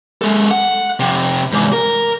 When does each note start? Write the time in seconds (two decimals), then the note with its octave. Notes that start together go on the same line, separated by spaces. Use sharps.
0.22 G#3 A4
0.51 F#5
1.00 F2 C3
1.52 E2 G#2
1.73 A#4